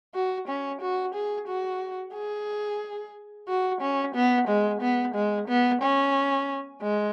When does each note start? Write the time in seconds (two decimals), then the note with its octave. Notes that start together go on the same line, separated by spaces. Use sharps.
0.15 F#4
0.48 C#4
0.81 F#4
1.14 G#4
1.48 F#4
2.14 G#4
3.49 F#4
3.81 C#4
4.15 B3
4.48 G#3
4.82 B3
5.15 G#3
5.48 B3
5.82 C#4
6.82 G#3